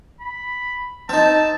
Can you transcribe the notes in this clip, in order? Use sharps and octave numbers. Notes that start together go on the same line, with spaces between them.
B5
C4 D#4 A5